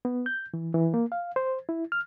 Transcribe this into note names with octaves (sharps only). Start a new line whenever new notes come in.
B3
G6
E3
E3
A#3
F5
C5
E4
F6